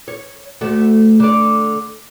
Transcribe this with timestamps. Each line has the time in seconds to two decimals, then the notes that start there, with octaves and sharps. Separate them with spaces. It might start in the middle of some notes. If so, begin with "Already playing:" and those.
0.08 C#5
0.61 D2 A3 F#4
1.20 D3 D5